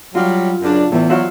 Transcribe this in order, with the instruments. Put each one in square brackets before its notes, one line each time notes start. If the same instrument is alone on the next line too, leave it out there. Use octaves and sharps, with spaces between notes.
[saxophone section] F#3 G3 [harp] F4
[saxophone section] F#2 C#3 D4
[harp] E2 [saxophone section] A2 E3
[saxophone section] F#3 [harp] F4 E5 F#5